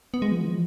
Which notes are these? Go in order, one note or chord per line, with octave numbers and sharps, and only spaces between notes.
B3
G#3
F3
E3
F3